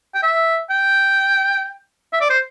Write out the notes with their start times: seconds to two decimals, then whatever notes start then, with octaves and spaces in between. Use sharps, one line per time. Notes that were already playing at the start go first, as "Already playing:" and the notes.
0.15 G5
0.23 E5
0.70 G5
2.13 E5
2.21 D5
2.30 C5